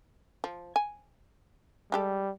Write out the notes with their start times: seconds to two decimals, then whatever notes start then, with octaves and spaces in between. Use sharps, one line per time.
0.44 F3
0.76 G#5
1.92 G3 G#3 G4 A4